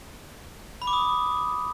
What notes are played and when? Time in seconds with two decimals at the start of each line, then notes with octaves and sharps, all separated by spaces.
0.82 B5
0.87 D6
0.93 D#6